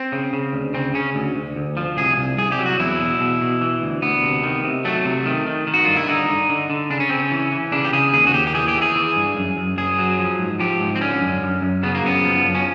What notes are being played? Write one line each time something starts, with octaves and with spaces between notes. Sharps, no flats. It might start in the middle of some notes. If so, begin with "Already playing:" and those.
Already playing: C4
C#3
C#3
D2
C#3 C4
C#3 C#4
D2
D2
D2
F3
C2 G#4
C2
C2 G#4
G4
F#3
F#4
E2 E4
B2
B2
B2
E3
D2
D2 B3
C3
D#3
C3
F#3 A3
C3
D#3
D#3
D#3
F#4
G2 F4
E4
D3 D#4
D3
D3
D3
C#3 D4
C#4
C#3 C4
C#4
E3
E3
C#3 D4
G4
C#3 G#4
D#2 G#4
F#4
D#2 G4
G4
E3 G#4
G4
E3
G#4
E3
G2
F#2
F#2
F#2 G#4
F#3
F3
G#2
F3 G4
G#2
C4
D3 C#4
F#2
F#2
F#2
C#3 B3
A#3
F#2 B3
F3
F#2
C#4